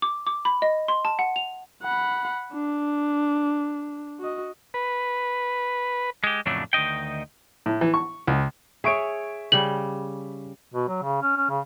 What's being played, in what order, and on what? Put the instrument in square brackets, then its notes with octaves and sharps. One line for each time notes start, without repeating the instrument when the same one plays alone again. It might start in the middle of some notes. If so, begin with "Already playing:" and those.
[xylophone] D6
D6
B5
D#5
C6
A5
F#5
F7
[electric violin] F#5 B5
D4
F#4 D#5
[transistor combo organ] B4
[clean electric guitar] G#3 G4
F2 A2 C#3 F#3 A3 D4
D2 D#3 D#4 D#5 G5
[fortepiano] A2
E3
C#6
C#2
[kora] G#4 C#5 [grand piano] E5 C#6 D7
[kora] C#3 G3 [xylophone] F#7
[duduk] B2
F#3
C#3
C#4
C#4
C#3